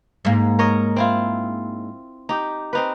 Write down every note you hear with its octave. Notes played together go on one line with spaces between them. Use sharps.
G#2 A#3
A#4 C#5 D#5
C4 E4 F4
D#4 G4
C4 D#4 B4